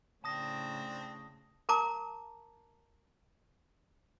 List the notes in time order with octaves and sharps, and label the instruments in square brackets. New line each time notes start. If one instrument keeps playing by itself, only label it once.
[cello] A2 C#3 [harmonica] C4 D4 [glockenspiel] A5 D#6 A#6
[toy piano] A#4 A5 A#5 D6